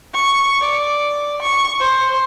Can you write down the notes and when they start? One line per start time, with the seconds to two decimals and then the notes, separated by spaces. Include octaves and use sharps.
0.14 C#6
0.61 D5
1.42 C#6
1.80 C5